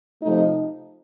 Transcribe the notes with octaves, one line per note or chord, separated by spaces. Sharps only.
C3 F3 A3 D#4